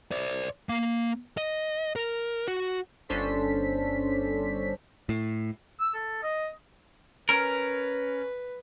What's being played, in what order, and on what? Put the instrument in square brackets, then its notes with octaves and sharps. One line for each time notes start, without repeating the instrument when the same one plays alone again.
[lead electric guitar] C5 D5
A#3 F5
D#5
A#4
F#4
[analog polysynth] G1 C#4 D4 A4 C5 B6
[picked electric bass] A2
[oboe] E6
A4
D#5
[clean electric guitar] C#4 A#4 [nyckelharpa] B4